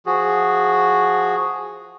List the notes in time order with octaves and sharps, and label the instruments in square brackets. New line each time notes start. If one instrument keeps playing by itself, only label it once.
[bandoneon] F3 F#4 G#4